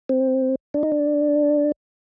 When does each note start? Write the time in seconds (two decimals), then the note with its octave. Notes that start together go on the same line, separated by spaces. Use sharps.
0.09 C4
0.74 D4
0.83 D#4
0.92 D4